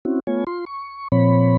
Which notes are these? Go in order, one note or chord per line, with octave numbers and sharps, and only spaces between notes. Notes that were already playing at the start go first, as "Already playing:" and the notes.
C4 C#4 E4 F#4
A3 B3 F4 C#5 G#5
F4 C6
C#6
A#2 F3 C4 C#5 B5